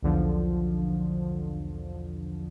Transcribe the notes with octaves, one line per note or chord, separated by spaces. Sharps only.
B1 E2 D3 F3